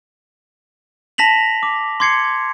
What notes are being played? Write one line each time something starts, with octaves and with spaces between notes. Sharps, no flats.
A5 A#6 B6 F7 F#7
D6
C6 D6 G#6 C7 C#7